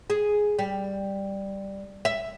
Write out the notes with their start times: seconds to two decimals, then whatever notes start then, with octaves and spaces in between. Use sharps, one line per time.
0.10 G#4
0.59 G3
2.05 E5